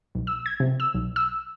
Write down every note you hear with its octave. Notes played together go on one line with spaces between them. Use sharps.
B1
E6
G#6
C3
E6
B1
E6